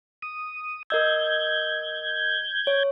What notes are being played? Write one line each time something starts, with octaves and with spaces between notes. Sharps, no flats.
D#6
A#4 D#5 E6 G6 G#6
C#5